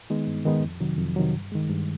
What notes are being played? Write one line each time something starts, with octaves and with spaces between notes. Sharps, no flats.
D#3 G#3 B3 D#4
G2
D#3 G#3 B3 D#4
F2
C3 D#3 F#3
F2
C3 D#3 F#3
G2
D#3 G#3
G2